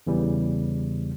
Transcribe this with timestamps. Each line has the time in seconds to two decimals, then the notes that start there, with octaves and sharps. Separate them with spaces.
0.07 E2 C#3 E3 G3